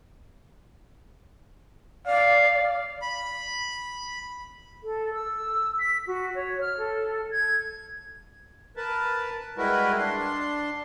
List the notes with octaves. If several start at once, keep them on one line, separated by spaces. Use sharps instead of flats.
D5 F5
B5
A4
E6
B6
F#4
C#5
F6
A4
G#6
A#4 B4 A5
G3 G#3 E4 F#4 A#4 B4
D4 C6